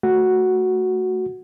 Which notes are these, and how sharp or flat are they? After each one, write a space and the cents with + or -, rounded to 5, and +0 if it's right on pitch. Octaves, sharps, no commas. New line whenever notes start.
A3 +0 F#4 +0